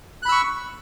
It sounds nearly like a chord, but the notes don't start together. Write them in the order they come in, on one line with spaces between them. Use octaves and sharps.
F#6 B5 E6 C#6